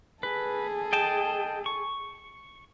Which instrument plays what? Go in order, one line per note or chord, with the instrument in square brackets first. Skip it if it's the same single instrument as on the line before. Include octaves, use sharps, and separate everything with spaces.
[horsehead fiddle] G#4 A4 [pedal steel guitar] B4
[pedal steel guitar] D#5 G5 A5
C#6